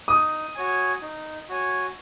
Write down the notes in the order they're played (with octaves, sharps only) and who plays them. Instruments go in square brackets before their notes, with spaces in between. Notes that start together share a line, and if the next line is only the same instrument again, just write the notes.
[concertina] D#4 [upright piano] D#6
[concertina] F#4 C#5 G#5
D#4
F#4 C#5 G#5